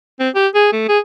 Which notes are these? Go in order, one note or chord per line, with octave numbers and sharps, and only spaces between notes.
C4
G4
G#4
A3
G#4